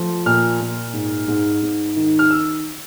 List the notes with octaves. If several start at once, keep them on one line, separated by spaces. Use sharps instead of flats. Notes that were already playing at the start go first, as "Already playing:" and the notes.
Already playing: F3 A3
A#2 F6
A#2
G#2
G#2
G#2
D#3
F6
E6